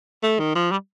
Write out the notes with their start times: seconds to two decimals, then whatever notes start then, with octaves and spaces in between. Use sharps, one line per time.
0.23 A3
0.39 D#3
0.55 F3
0.71 G3